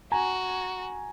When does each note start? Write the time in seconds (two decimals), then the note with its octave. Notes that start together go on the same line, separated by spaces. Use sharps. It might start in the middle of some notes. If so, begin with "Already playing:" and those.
0.12 F#4 G#5 A#5